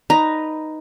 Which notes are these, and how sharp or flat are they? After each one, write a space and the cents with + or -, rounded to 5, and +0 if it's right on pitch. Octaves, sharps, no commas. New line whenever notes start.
D#4 +0 B4 +0 A#5 +0